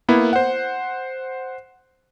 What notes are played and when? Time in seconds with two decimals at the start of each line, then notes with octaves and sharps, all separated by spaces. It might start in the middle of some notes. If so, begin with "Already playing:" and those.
0.08 A#3 B3 E4
0.33 C5 F#5